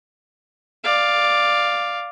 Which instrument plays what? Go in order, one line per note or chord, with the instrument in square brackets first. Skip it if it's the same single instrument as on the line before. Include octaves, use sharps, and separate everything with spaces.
[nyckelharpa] D5 F5